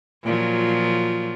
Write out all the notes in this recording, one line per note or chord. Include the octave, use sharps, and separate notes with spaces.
A#2 F3 F#3